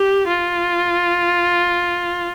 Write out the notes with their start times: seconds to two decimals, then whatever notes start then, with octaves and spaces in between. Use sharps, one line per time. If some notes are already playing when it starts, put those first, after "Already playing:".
Already playing: G4
0.28 F4